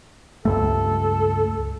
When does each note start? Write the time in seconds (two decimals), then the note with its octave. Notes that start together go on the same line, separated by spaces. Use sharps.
0.45 C#2 G2 A3 A4